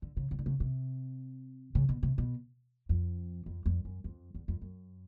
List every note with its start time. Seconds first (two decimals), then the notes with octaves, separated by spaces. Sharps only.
0.02 D3
0.17 C#3
0.31 C#3
0.39 D3
0.46 C#3
0.60 C3
1.75 C#3
1.89 B2
2.03 C3
2.18 B2
2.89 F2
3.46 F2
3.66 F2
3.85 F#2
4.04 F2
4.35 E2
4.48 F2
4.61 F#2